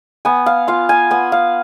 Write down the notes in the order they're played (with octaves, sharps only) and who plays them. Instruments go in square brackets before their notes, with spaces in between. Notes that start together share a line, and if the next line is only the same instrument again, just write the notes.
[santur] B3 G#5
F5
F4 F5
G#5
B3 G#5
F5